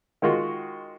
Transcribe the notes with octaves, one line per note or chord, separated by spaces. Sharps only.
D#3 G#3 F4 F#4